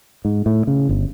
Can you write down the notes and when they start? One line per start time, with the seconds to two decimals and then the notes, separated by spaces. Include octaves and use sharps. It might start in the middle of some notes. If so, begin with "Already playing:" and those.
0.25 G#2
0.46 A2
0.67 C#3
0.89 G1